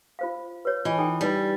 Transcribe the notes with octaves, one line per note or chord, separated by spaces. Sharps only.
F4 C5 F5
B4 C#5
E3 E4 F4 D#5
D#4 A4 G5
G3 D#4 B4 G#5